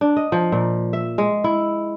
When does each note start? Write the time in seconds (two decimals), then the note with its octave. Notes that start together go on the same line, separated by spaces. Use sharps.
0.01 D4
0.17 D#5
0.32 F3
0.52 A#2
0.93 E5
1.18 G#3
1.44 E4